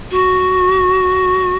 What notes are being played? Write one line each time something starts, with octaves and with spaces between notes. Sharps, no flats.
F#4